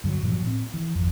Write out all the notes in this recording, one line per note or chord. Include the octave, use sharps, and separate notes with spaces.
G2 D3 F#3
G2 A#2 F3 F#3
A2 C4
E3
G#1 F2